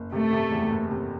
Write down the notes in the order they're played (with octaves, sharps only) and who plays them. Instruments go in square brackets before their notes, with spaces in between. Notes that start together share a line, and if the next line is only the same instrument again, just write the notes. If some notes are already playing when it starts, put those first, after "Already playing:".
Already playing: [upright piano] F#1
[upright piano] C3 [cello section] A3
[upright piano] C3
E2
F#1
C3